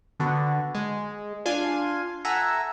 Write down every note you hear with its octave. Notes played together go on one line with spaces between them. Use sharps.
D3 B3 D4 F#4
G#3
D4 F4 F5 G#5 C6
A4 E5 F#5 G#5 A#5 E6